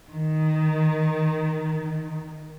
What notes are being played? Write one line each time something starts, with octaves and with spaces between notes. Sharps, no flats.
D#3